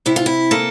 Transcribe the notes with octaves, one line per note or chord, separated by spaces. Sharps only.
C3 E4
F4
E4
A#3 A4